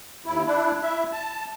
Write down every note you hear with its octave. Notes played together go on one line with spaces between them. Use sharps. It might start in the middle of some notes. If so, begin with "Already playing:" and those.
D#2 E4
D4 E4
E4 E5
A5